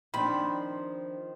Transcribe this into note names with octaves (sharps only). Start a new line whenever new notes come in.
D#3 F3 C4 D4 C5 B5